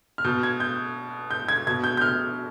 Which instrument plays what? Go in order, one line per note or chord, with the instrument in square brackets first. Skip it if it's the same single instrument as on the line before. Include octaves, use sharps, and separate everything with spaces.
[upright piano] F6
B2 G6
G#6
G6
G6
G#6
B2 G#6
G6
G6
F6